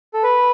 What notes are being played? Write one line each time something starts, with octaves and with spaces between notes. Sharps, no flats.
A4
B4